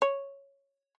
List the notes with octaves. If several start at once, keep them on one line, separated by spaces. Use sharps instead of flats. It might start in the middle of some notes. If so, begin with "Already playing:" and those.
C#5